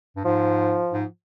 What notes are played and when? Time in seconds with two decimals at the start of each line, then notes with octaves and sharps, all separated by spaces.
0.16 G2
0.25 G#2 F3
0.93 G#2